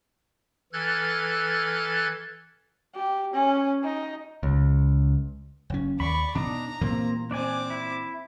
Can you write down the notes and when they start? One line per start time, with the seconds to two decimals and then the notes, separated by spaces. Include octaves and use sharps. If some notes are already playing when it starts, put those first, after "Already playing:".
0.73 E3 A4 F6 F#6 G#6 A6
2.95 G4
3.34 C#4
3.84 D#4
4.43 C#2
5.70 F#1 C#4
6.00 D#2 D5 B5 C#6
6.35 B2 D4 D#4 A#5
6.81 A#2 E3 G3 A#3 C4
7.31 C4 D4 D5 G#5 D6
7.70 E4